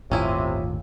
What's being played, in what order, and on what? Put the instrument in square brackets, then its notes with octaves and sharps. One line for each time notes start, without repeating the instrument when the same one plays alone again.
[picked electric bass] G1 D#2 A2 [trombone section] C3 [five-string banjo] C#4 E4 G#4 [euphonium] F4